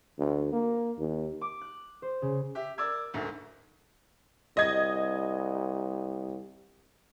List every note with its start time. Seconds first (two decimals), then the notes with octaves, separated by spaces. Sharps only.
0.18 D2
0.52 A#3
0.98 D#2
1.41 D6
1.61 F#6
2.02 C5
2.22 C#3
2.55 G4 E5
2.78 A#4 D5 D6 E6 G#6
3.14 D2 G#2 A3 A#3
4.57 C2 D#5 G#6